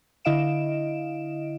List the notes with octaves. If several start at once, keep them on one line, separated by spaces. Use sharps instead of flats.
D3 E4 D#5 F5 D7 E7